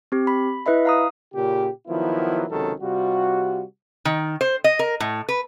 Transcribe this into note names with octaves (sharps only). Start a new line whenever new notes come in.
C4 G4
B5
E4 B4 D#5 E5 B5
F5 A#5 D#6
A#2 C#3 G4
D#3 F3 F#3 B3 E4
C#2 C3 D#3 F#3 C#4 A4
C3 G3 F4 F#4
D#3
C5
D#5
A#4
A2
B4